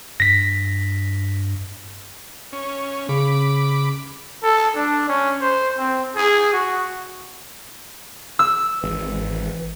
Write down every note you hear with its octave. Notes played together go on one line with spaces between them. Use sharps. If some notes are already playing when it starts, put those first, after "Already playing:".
G2 A#6 B6
C#4
C#3 B5 D6
A4
D4
C#4
C5
C4
G#4
F#4
E6
G#1 E3